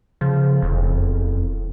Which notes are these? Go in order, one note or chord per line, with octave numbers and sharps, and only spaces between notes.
C#3 F3
E1 F2